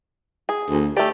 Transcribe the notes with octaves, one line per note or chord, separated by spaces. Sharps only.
G#4
D2
A3 G4 D5